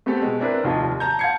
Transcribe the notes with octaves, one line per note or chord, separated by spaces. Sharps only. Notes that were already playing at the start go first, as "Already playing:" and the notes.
A3 B3 C4 G4 A4
B2 G#3
C4 D4 E4 A#4 B4
F1 D#2 F4 D#5 A5
A5 A#5 G6
F5 F#5 A5 G#6 C7 C#7